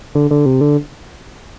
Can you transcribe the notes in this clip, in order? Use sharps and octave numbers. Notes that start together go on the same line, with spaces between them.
D3
D3
C3
D3